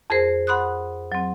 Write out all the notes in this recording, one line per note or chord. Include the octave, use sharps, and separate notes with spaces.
F2 G#4 A#4 C5
F#5 B5 C6 D#6 F#6
F#3 C4